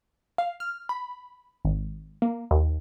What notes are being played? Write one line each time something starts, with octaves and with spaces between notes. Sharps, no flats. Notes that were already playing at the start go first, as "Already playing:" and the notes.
F5
F6
B5
G#1
A#3
D#2